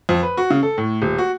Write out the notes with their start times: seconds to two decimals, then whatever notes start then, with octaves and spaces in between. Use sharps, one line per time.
0.09 F2
0.23 B4
0.37 F#4
0.50 C#3
0.63 A4
0.78 A2
1.02 D#1
1.18 F#4